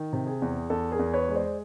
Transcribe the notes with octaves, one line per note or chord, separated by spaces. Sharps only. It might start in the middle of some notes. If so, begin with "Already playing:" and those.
Already playing: D#3
C3
G#4
E2
E2 A4
G#4 A#4
E2
B4 C#5
G#3
C5 D5